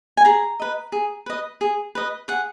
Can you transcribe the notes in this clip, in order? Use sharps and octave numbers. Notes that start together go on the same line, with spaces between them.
G#5
G#4 A#5
B4 D#5
G#4
B4 D#5
G#4
B4 D#5
G#4 F#5